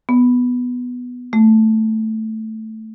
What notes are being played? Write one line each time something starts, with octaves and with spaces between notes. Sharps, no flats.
B3
A3